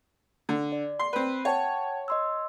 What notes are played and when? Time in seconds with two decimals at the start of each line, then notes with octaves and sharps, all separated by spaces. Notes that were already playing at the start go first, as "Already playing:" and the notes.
0.49 D3
0.72 D5
0.99 C6
1.13 C4 B4
1.45 C#5 F#5 G5 A5
2.08 D#5 C6 E6